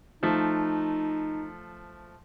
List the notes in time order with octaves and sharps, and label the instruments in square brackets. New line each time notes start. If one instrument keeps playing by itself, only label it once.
[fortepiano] F3 A3 [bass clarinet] D#4